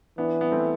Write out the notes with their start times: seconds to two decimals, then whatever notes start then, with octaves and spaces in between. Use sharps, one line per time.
0.18 E3 B3 D4
0.41 B3
0.52 A3 C4